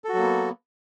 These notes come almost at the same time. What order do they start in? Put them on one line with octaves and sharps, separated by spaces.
A4 F#4 F#3 A#3 B3